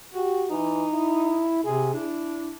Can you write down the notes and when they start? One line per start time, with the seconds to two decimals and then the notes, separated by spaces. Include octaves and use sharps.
0.14 F#4 G4
0.50 E3 D#4
0.92 E4
1.64 C3 G#4
1.94 D4 E4